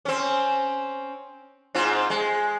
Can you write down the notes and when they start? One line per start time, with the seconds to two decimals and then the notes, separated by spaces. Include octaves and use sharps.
0.05 C4 C#4
1.75 G#2 C4 F4
2.10 G#3